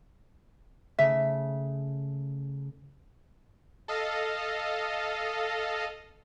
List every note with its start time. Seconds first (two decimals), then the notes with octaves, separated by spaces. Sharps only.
0.99 C#3 A3 E5
3.88 A4 D#5 F5